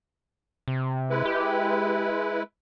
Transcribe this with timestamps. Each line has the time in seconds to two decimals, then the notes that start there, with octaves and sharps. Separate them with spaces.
0.68 C3
1.10 G#3 E4 B4
1.25 G4